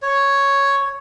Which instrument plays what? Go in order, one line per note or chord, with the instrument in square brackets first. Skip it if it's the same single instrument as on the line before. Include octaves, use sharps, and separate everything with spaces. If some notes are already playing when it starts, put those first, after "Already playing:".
[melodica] C#5